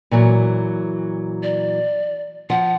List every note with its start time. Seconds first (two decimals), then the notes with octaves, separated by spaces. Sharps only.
0.11 A#2 E3 F#3
1.43 D5
2.50 F3 F#5